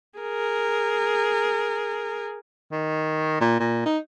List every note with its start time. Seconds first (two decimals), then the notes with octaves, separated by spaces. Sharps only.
0.19 G#4 A#4
2.72 D#3
3.41 A#2
3.60 A#2
3.85 D#4